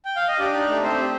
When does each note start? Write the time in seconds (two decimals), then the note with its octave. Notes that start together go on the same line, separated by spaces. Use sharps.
0.05 G5
0.16 F5
0.28 D#5
0.39 D4 G4 D5
0.54 D#4
0.68 A3
0.83 A3 C4 C5
0.98 G4